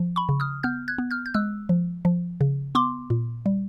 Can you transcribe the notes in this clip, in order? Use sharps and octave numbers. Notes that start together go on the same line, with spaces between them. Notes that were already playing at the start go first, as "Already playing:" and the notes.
Already playing: F3
B5 C#6
C#3
D#6 F6
B3 F6 G6
F#6 G#6
B3
F6 G6
G6
G#3 E6 F#6
F3
F3
C#3
B3 C6 D6
A#2
G3